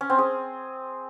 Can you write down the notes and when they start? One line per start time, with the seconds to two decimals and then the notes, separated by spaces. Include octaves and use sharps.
0.01 C#4
0.10 C4
0.19 G#4